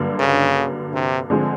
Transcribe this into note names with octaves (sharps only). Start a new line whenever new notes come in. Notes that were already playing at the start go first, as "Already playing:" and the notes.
Already playing: G2 D3 F#3 A#3
C#3
C3
D3 F3 G#3 C4